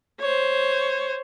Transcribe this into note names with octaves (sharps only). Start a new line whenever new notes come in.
C5 C#5